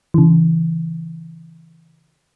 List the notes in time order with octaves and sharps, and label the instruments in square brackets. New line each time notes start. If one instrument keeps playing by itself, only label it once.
[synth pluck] C#3 E3